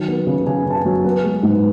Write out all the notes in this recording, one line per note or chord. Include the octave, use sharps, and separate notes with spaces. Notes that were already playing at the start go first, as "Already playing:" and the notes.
Already playing: D#3 F#3
B3
C#3
C#3 G#5
C#3 A5
G#5
F#3
B3 B4
G#3
G#2